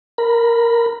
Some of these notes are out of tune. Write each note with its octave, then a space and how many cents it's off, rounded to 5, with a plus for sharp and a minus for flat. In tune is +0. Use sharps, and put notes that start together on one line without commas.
A#4 +0 B5 +0